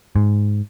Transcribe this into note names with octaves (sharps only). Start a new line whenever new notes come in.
G#2